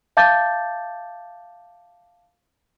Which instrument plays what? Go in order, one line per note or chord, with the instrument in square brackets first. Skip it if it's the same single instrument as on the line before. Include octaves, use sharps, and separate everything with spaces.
[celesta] E5 F5 A5 D6 G6 A6